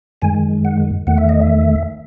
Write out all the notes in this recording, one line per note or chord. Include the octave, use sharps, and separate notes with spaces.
F#2 D#3 G#3 G#5
F#5
E2 D#3 A3 F#5
E5
D#5
E5